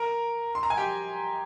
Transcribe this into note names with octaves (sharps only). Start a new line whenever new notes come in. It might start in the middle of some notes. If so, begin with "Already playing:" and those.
Already playing: A#4 A#5
C6
A#5
G#5
G4 G5